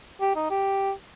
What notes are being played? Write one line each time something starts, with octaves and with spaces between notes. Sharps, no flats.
G4
D#4
G4